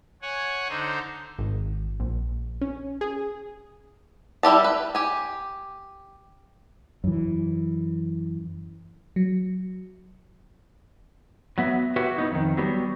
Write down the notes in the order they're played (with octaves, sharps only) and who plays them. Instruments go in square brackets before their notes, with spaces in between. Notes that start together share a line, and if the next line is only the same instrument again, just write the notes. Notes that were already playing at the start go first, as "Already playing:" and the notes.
[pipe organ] C#5 F#5 G#5
D3 D#4 C5
[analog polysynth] G#1
A#1
C#4
G#4
[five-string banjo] G3 E4 G4 A5
B4
G4 G#5
[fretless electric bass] F#2 E3
[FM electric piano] F#3
[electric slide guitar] F#3 B3 E5
F#4 G4 B4 C#5 E5 F#5
B3 D#4 E4
F2 D#3
F#3 G3 B3 G4